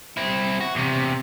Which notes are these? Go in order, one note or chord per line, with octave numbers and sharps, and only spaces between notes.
C4 E4
F#4
E2 C3